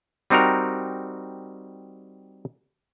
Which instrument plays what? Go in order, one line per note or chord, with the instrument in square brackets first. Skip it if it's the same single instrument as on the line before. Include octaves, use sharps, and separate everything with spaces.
[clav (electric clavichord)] G3 C4 D#4 F#4 A#4 A#5